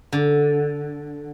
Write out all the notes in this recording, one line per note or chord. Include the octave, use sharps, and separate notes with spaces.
D3